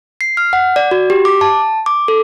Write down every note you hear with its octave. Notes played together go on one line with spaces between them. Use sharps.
C7
F6
F#5
D5
F#4
G4
D6
A5
D6
A4